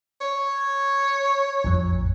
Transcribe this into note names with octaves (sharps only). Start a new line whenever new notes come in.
C#5
A1 F2